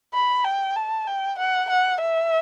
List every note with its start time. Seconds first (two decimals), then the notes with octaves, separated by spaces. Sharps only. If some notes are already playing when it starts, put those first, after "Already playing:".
0.14 B5
0.45 G5
0.76 A5
1.07 G5
1.39 F#5
1.70 F#5
2.01 E5